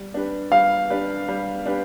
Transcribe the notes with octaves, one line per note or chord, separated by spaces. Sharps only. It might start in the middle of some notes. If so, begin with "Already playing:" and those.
Already playing: G3
D4 G4 B4
G3 F5
D4 G4 B4
G3
D4 G4 B4